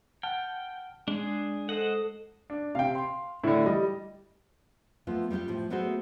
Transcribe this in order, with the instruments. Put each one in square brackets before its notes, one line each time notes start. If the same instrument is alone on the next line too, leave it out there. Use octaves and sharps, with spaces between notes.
[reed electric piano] F#5 A5 F6 [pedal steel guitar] G5
[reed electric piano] G#3 [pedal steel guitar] D4 G#4
[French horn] A4 [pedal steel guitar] C5 D#5 F#5
[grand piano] D4
[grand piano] C3 G5 [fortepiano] F5
[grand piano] C6
[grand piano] A2 D3 [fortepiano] E4
[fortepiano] G3 [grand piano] D#5
[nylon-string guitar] F3 A3 B3 F4
G3 B3 D#4 F4 G4
A2 F3
F#3 A3 B3 F#4 G#4 C5